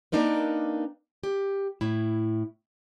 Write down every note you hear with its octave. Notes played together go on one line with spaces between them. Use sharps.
A#3 C4 D4 D#4 A#4 B4
G4
A2 E4